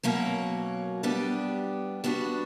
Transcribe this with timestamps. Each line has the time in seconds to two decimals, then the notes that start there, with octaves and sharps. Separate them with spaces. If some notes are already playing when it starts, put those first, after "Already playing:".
0.03 B2 F#3 A#3 C#4
1.03 G3 B3 D4 G4
2.04 G3 B3 D4 F#4